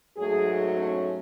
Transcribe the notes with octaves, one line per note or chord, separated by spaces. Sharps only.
G#2 F#3 A3 G#4
C#4